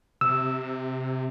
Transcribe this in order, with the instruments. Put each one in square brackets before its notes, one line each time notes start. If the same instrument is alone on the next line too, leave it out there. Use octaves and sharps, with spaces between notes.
[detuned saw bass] C3 [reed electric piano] E6